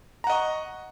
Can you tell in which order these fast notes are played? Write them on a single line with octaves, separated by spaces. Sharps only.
A#5 F#5 D#5 C#6